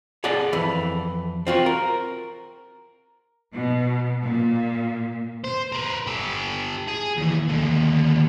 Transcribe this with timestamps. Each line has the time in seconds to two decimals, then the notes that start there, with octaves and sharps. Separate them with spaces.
0.24 G#4 C#5 D5 F#5 A5
0.53 F2 E3
1.47 C4 F4 F#4
1.66 A#4
3.55 B2
4.24 A#2
5.44 C5
5.72 A#4 B4
6.07 G4 A4
6.87 G#4
7.17 D#2 E3
7.48 D#2 D3